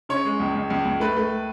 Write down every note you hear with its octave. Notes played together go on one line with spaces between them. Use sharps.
C#3 C#5
G#3
C#2
C#2
C#2
C#2
A3 B4
A3